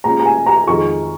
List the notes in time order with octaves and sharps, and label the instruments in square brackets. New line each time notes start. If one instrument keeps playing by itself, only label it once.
[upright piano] A#2 G#3 C#4 A#5
A#5
G#5
A#5
F2 D#3 G#3 C#6